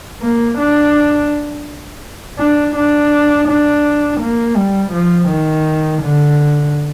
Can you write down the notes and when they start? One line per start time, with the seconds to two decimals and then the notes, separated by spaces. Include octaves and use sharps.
0.22 A#3
0.59 D4
2.39 D4
2.76 D4
3.49 D4
4.21 A#3
4.56 G3
4.93 F3
5.29 D#3
6.02 D3